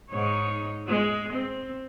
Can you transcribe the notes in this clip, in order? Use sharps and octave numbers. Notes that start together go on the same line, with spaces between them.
G#2 D#4 C#5
G#3
C4